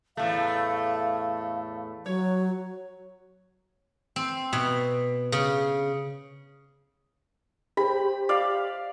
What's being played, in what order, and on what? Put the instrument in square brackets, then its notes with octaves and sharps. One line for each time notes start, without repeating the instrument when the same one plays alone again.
[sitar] E2 A2 A3 [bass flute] F5
[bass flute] F#3 [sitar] C#5
[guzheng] C4
B2
C#3
[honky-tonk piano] G4 C5 [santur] B5
[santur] D5 F5